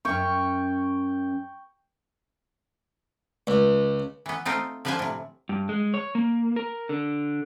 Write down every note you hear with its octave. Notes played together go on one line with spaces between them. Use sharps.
F#2 C#4 E5 G5 C#6
C#2
E3 B3
A3 C4 D#4 F4
D3 F3 B4 C5 F5 G#5
A2 C3
G2
G#3
C#5
A#3
A#4
D3